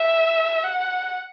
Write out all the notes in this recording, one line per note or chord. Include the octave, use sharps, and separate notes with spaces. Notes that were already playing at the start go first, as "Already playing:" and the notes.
Already playing: E5
F#5